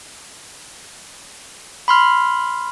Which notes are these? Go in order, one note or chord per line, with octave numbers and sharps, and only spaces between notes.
B5 C6 F6